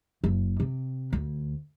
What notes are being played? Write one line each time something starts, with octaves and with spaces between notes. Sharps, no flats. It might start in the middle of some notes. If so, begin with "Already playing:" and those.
F#1
C3
D2